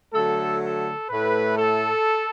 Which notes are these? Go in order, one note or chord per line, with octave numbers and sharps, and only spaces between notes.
D3 F#3 A3 A4
A4
A2 A3 B4
A4